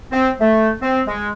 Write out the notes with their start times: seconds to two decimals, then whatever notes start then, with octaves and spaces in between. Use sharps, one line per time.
0.12 C4
0.39 A3
0.82 C4
1.07 G#3